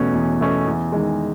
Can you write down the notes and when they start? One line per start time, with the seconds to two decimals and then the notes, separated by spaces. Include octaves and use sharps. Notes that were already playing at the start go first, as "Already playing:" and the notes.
Already playing: E2 B2 A3 C#4
0.14 E2
0.40 B2 A3 C#4
0.67 E2
0.92 D#3 G#3